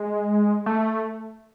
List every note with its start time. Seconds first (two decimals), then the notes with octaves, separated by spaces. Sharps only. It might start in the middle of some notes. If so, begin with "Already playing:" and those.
Already playing: G#3
0.66 A3